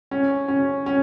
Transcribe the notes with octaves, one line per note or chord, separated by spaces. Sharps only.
C#4
C#4
C#4